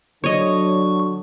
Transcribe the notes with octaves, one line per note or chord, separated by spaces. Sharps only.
D3 F#3 C#5 D#5 C#6